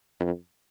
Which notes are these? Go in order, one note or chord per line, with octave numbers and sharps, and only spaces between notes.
F2